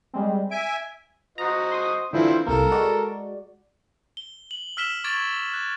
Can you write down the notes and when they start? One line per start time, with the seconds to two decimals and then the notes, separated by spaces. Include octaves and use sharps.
0.14 G3 G#3 C4
0.51 E5 G#5 D7
1.38 F#4 C5 D#5 A#5
1.72 C6 D#6
2.13 D3 E3 F3 C4 E4 F4
2.46 C2 A#3 A4 A#4
2.72 G#3 F#4 D5
4.17 G7
4.51 F#7
4.77 E6 F6 B6 E7 G7
5.04 C#6 D6 G#6 A6 D7
5.53 F#6